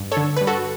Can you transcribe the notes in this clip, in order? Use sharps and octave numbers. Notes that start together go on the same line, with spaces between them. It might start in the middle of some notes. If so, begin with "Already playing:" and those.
Already playing: G2
A4 C#5
D3
G2 B4
F#4 A4